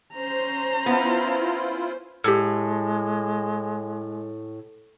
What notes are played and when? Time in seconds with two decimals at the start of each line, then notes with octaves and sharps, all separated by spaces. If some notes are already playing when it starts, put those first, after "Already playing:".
0.15 C#4 C5 A#5
0.86 B3 E4 F4
2.24 A2 G#3 G4 E6